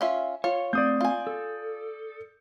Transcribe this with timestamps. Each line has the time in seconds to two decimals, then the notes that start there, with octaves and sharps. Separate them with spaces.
0.01 C#4 F4 E5
0.44 F4 C#5
0.73 A3 C4 D5 D#6 G6
1.01 F4 G#5
1.27 A4